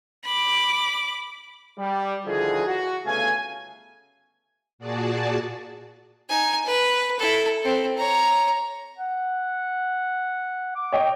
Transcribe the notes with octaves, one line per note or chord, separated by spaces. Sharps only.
B5 D6
G3
D3 D#3 F3 E4 F#4 G#4
F#4
G1 C#3 A3 B3 F5 G#5
A#2 F#4 G#4 D5 A5
D#4 G#5
B4
E4 A4
C4 A4
C#5 A#5
F#5
D6
C#5 D#5 G5